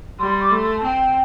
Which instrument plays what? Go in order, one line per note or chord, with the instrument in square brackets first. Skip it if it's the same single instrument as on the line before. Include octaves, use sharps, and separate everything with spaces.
[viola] G3 [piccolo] C6
[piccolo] C6
D6
[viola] A3 [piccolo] C6
[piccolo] C6
A5
[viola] C4 [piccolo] G5